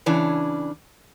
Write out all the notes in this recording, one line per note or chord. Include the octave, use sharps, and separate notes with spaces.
C#3 E3 C#4 D4